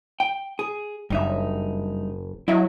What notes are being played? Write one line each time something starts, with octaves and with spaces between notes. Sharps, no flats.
G5
G#4
F#1 G2 D#4 E5
F#3 E4 D#5 E5